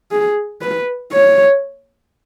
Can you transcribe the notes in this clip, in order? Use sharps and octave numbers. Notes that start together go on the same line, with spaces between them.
G#4
B4
C#5